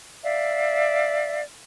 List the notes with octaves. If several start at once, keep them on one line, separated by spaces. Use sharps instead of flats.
D5 E5 F5